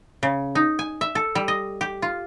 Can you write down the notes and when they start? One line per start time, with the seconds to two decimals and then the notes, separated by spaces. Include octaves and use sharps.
0.23 C#3
0.55 D#4
0.79 G#5
1.01 E5
1.15 A4
1.35 G3
1.48 D#5
1.81 G4
2.02 F4